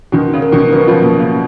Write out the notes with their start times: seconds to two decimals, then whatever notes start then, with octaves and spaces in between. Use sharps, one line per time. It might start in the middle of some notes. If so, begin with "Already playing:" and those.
0.12 B2 D#3 F#4
0.33 C#3
0.42 A#4
0.52 B2 D#3
0.72 D#3 F#3 B4
0.87 C#3 F3
1.02 B2 A#3
1.18 C#3